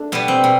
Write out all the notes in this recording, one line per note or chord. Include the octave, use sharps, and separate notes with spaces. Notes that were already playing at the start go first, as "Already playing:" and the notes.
Already playing: A3 D4
B2 G3 B3
C4
B2